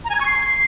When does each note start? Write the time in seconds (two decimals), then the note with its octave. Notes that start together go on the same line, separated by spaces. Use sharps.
0.05 A#5
0.10 G#5
0.15 G#6
0.20 C#6
0.26 C7